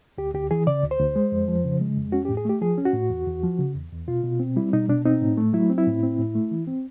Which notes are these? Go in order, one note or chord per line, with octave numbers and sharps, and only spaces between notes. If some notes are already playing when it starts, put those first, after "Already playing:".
D2 G4
D2 G4
E3 G#4
C#3 D5
D2
C5
D2
G#3
F2
F3
C#3
G#3
F2
C#4 F#4
A2 G4
G#4
A3 G4
F3 G#4
C#4
F#4
A2
E2
E2
F3
C#3
E2
E2
B2 F4
B2
C4
G3 E4
B2 D#4
B2 D4
C4 D#4
A2
A3
F#3 E4
C4
E4
A2
C4
A2
A3
E3
C4